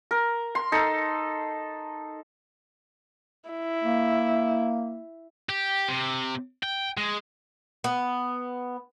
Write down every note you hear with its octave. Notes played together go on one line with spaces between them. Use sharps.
A#4
C6
D#4 A4
E4
A#3
G4
C3
G5
G#3
B3